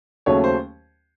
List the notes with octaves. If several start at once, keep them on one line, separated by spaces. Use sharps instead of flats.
D#2 C#3 F#3 A3 C#4 C#5
C5